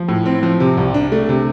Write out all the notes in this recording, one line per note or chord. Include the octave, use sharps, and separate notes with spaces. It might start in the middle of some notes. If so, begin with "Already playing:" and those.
Already playing: F3
A2
C4
F3
C3
C2
D4
A3
C3